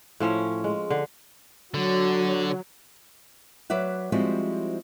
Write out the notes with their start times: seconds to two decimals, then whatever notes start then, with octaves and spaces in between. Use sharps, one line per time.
0.20 A2 F3 C#4 C#5
0.64 G#3
0.90 D3
1.74 D3 F#3
3.70 F#3 B4 D5 E5 F#5
4.12 F3 G3 G#3 C4 E4 F#4